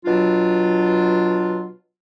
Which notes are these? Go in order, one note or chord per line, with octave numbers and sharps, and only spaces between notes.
B2 F#3 D4 F4